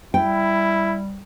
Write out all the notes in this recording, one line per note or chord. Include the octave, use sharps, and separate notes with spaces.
G3 E4 G5